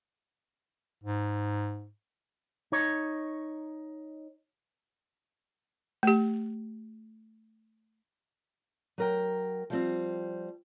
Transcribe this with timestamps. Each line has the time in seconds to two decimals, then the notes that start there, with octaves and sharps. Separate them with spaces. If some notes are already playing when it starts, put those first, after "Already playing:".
1.04 G#2
2.72 D#4 C#5
6.03 A3 G4
8.98 F#3 A#4 G5
9.70 F3 G3 C4